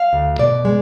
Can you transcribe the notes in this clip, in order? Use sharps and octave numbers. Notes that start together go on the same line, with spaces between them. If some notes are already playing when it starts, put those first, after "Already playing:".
Already playing: F5
D2
B2 D5
G#3